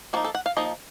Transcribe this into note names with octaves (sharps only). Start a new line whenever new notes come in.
F3 A#3 D#4 F#4
A4
F#5
F5
F3 A#3 D#4 D#5